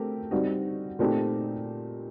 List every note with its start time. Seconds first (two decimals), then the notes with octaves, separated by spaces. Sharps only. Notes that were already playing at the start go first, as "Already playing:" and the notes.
Already playing: A3 C4 G4 A#4
0.31 G3 C4 D#4 F#4
0.99 A#2 A3 C4 D#4 G4